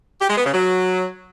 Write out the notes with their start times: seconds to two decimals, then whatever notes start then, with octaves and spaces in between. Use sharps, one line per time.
0.21 G4
0.29 G#3
0.37 B3
0.45 C#3
0.53 F#3